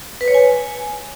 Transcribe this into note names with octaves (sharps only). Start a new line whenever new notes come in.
B4
C#5
G#5